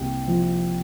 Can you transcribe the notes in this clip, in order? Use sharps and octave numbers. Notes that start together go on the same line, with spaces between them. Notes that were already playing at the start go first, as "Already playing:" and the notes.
Already playing: C2 A#3 G5
F3